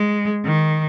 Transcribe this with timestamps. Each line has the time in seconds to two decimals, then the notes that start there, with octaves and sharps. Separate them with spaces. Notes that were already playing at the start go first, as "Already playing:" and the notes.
Already playing: G#3
0.46 D#3